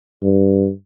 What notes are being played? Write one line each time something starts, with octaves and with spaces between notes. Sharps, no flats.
G2